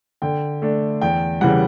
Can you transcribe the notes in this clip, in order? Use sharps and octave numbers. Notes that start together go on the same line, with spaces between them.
D3 G5
A3 D4
E2 G5
C#3 E3 G3 F#5